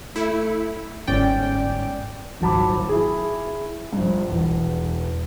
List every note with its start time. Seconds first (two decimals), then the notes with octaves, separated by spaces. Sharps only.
0.16 A3 E4
1.07 G1 G#2 C#4 D5 G5
2.41 D#1 G#1 F#3 A5 B5 D6
2.89 E4 G#4
3.93 A#1 G2
4.29 E1 E2